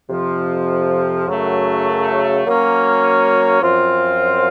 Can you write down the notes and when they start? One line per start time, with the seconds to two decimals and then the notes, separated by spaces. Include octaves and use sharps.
0.10 F2 C3 F3
1.27 F#2 C#3 F#3 A3
2.45 F#3 A#3 C#4
3.62 F#2 F3 C4 F4